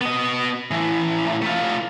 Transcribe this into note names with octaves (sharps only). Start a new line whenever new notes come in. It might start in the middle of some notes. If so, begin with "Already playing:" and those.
B3 D#5
A2 E3
A3 F4